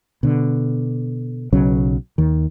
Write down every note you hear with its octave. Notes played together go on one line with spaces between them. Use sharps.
B2 D3
B1 C#3 F#3 C#4
D#2 D#3